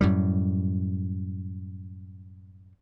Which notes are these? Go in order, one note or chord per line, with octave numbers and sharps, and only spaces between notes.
F#2 A2 G3